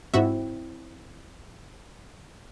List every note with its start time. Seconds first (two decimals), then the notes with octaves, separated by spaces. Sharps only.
0.14 G#2 C4 E4 F#4 E5